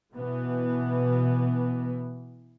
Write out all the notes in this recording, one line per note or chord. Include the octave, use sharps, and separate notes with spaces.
B2 E3 B3